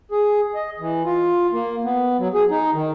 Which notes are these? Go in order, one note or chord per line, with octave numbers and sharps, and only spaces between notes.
G#4
D#5
E3
F4
A#3
B3
F#3
G#4
D#4
D#3